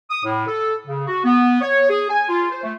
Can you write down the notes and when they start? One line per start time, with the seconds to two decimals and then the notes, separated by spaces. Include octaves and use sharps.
0.10 D#6
0.25 A2
0.47 A4
0.86 C#3
1.07 F#4
1.24 B3
1.61 C#5
1.89 G#4
2.09 G#5
2.29 F4
2.50 C5
2.63 A3